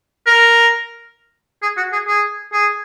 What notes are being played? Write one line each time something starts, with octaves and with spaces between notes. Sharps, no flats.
A#4
G#4
F#4
G#4
G#4
G#4